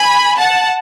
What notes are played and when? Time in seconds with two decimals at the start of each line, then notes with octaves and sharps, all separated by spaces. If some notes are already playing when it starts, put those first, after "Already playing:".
Already playing: G#5 B5
0.39 F#5 A5